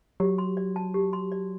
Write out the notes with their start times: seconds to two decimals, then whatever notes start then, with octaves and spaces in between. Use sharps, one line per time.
0.20 F#3 G4
0.38 C6
0.57 D5
0.76 A5
0.94 G4
1.13 C6
1.32 D5